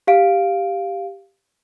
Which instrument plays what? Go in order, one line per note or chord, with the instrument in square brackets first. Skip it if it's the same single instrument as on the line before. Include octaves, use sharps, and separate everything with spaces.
[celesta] G4 F5 D7